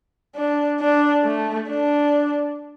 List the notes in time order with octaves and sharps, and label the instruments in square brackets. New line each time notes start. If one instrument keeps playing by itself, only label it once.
[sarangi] D4
D4
A3
D4